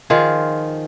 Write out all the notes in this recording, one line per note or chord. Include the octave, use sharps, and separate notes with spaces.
D#3 F3 F4 G#4